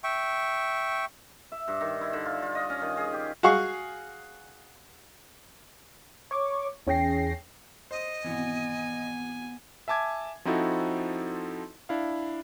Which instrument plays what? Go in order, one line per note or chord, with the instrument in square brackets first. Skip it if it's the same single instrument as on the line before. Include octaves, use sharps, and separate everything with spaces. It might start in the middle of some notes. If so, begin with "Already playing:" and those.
[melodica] E5 G5 C#6
[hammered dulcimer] E5
G2
D#3
E4
D3
F4
F4
D#5
C#4
D#3
G#4
G4
[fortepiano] F#4 G#4 F5 C#6
[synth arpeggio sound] C#5 C#6 D6
E2 C#4 G#4 G5 A#6 C7
[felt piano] C5 D#6 [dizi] D#5
[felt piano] G#1 B2 E3 [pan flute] B3 [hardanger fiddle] G#5
[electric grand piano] E5 G#5 A5 D6 G#6
F3 C4 D#4 E4 F#4 A4
D4 E4 F5